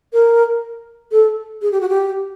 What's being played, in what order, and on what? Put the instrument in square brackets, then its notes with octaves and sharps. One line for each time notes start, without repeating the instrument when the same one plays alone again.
[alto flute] A#4
A4
G#4
G4
F#4
G4